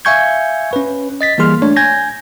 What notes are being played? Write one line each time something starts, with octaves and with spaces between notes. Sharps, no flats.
E5 F5 G#5 C#6 G6 G#6
C#4 B4
D#5 A6 B6
E3 G3 A#3 G#4 C6 F6
A3 D4 C#5
G#5 G6 G#6 A#6